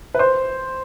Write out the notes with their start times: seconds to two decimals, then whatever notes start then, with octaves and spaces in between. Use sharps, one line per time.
0.14 B4
0.19 C5